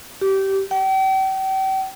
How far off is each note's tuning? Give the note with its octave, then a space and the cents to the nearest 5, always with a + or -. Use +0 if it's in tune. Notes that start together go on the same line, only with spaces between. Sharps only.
G4 -20
G5 -40